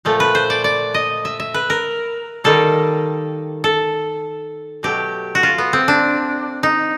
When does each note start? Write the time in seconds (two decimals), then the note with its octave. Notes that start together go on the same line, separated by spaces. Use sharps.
0.05 A#2 F3 A3
0.20 B4
0.35 C5
0.50 D5
0.64 D5
0.94 D#5
1.25 E5
1.40 E5
1.54 B4
1.70 A#4
2.44 D#3 G3 A#3 A4
3.64 A4
4.83 B2 F#3 A3 G4
5.35 F#4
5.43 F4
5.58 B3
5.73 C4
5.88 D4
6.63 D#4